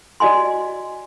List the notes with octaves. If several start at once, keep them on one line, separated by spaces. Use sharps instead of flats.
F#4 D5 D#5 G#5 C6